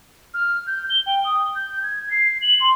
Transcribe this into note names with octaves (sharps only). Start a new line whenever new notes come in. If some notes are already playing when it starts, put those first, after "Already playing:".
F6
G6
G7
G5
D#6
G6
G#6
C7
F#7
C6